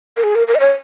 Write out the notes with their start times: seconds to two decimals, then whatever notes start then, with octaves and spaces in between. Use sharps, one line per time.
0.17 A#4
0.24 G#4
0.35 A#4
0.48 A#4
0.55 D#5
0.60 C#5